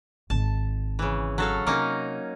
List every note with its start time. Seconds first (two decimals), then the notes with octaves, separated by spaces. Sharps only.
0.30 G#1 D#3 A5
0.99 C#3 E3
1.38 F#3 A4 F5
1.67 C3 A#3 C#4 D#4